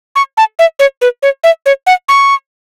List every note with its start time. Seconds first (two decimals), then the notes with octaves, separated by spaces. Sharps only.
0.16 C#6
0.37 A5
0.59 E5
0.79 C#5
1.01 B4
1.23 C#5
1.44 E5
1.66 C#5
1.87 F#5
2.09 C#6